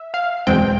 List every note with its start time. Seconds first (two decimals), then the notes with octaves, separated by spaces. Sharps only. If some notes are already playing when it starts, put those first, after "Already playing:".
Already playing: E5
0.14 F5
0.47 E2 B2 G#3 C4 G5